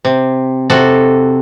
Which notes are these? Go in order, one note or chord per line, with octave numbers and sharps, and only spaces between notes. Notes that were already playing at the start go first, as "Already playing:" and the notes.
C3
C3 F#4 A4